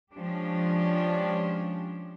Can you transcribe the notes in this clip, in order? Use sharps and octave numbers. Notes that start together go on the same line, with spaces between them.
F3 G#3 C#4 D4 G4